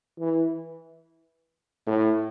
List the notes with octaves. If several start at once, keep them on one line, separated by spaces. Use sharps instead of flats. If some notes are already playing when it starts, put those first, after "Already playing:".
E3
A2